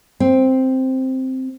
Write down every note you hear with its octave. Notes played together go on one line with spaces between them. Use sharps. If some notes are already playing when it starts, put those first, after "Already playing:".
C4